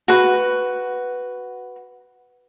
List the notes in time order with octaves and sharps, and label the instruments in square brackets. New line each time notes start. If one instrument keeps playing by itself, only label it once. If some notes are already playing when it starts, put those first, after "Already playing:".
[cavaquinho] F#4 B4